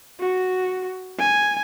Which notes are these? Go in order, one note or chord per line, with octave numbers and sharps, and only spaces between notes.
F#4
G#5